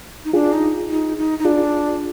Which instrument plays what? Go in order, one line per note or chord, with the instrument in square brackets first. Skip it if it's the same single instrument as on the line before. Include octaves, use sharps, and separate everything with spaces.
[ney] D#4
[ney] D4 [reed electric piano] F4 G#4
[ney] D#4
D#4
D#4
D#4
[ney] D4 [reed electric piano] F4 G#4